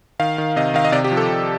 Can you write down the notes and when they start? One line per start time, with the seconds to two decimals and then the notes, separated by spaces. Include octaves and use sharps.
0.20 D#3 F5
0.38 D#3
0.56 C3 D#5
0.74 D#3 F5
0.85 D#5
0.92 C3 D5
1.04 G4
1.11 F3
1.17 A4
1.29 C3